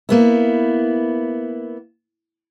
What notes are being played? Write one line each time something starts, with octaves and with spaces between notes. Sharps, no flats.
A#3 B3 E4